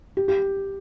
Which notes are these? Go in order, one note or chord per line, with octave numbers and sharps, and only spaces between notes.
G4
G4